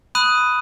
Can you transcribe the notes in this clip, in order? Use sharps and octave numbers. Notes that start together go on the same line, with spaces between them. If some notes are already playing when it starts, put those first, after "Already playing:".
B5 D#6 F#6 D#7